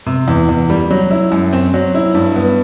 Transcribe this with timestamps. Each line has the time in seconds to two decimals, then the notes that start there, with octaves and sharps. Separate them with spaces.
0.06 C3
0.28 E2
0.49 E2
0.70 G3
0.90 F#3
1.11 E4
1.32 F#2
1.53 C4
1.74 F#3
1.94 E4
2.15 G2
2.36 B3